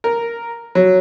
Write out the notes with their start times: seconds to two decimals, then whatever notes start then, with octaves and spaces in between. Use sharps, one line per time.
0.04 A#4
0.75 F#3